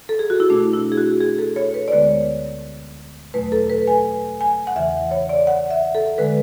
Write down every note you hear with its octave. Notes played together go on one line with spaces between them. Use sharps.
A4
G#4
F#4
E4
B2 A3 D4
E4
G#4
F#4
G#4
A4
C#5
B4
D5
D2 D3 G#3 B3 C#5
E2 B2 F#3 A3 B4
A4
B4
G#5
G#5
F#5
E2 C#3 E3 E5
C#5
D5
F#5
E5
A4
D3 G#3 B4